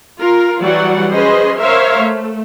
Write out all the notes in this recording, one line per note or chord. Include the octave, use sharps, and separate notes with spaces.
F4 A#4
E3 F#3 G3 F#4 D5 F#5
C#4 G#4 B4 C5 D#5 C6
A#4 C5 C#5 E5 F5
A3